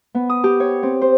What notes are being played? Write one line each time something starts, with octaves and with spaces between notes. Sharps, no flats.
B3
D#6
G4
C#5
C4
C5